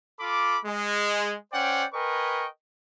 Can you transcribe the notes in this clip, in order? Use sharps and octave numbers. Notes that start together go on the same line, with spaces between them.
F4 A4 B5 D6
G#3
C#4 C5 D5 F#5 G5
A#4 B4 D#5 G5 G#5 C#6